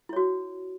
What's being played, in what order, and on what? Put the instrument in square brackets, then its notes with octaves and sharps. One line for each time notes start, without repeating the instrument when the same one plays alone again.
[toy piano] E4
C#5
F#4